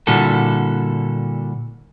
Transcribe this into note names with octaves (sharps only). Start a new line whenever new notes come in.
A#2 D3 G3 E4 F#4 A4